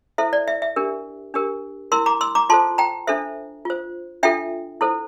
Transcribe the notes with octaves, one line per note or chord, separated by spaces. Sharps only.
E4 A4 C5 E5
D5
E5
E5
D4 G4 A#4
D4 G4 A#4
E4 A#4 C6 E6
A#5 D6
C6 E6
A#5 D6
F4 A4 C5 A5 C6
G5 A#5
D4 A4 C5 E5
F4 C5
D4 F4 A4 E5 G5
E4 A4 C5